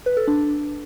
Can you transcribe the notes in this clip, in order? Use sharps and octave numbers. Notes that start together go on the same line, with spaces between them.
B4
A4
D4